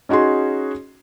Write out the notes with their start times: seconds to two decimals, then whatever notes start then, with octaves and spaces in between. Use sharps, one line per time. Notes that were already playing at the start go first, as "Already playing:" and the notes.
0.09 C#4 D#4 F#4 G#4 C6